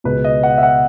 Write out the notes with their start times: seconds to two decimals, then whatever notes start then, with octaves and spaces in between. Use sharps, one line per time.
0.04 C#2 B2 B4
0.24 D#5
0.43 F#5
0.58 E5
0.63 F#5